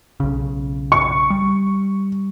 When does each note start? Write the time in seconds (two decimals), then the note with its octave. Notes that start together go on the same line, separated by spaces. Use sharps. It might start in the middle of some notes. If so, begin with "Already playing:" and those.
0.20 B1 C#3
0.92 C#6
1.30 G3